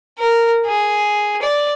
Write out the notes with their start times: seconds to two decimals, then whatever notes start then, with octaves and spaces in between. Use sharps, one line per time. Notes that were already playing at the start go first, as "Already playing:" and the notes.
0.19 A#4
0.66 G#4
1.42 D5